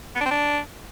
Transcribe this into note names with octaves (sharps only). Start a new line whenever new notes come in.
B3
D4
C4
D4